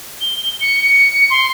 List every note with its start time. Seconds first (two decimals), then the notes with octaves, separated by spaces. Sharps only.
0.21 G7
0.61 C#7
1.30 C6